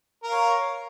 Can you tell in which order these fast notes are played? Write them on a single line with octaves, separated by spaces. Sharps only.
A#4 F5 C#5